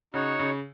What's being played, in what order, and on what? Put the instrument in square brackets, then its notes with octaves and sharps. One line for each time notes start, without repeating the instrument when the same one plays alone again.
[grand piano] C#3 [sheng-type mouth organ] D#4 F#4 C#5 F#5
[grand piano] C#3